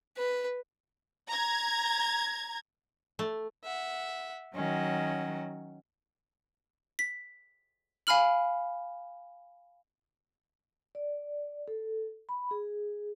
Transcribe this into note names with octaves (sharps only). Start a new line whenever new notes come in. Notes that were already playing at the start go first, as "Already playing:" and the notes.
B4
A#5 G#6
A3
E5 F#5
D#3 F#3 C#4 F#5
B6
F5 G#5 B5 F6 F#7
D5
A4
B5
G#4